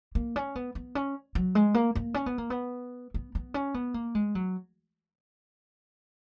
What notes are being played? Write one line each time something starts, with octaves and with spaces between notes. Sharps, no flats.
A#3
C#4
B3
B3
C#4
F#3
G#3
A#3
A#3
C#4
B3
A#3
B3
B3
B3
C#4
B3
A#3
G#3
F#3